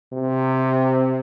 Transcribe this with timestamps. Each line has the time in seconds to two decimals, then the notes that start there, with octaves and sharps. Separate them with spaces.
0.12 C3